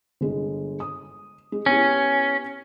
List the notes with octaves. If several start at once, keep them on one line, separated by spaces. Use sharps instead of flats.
G1 G#3
D#6
G#3
B3 C#4 E4 G4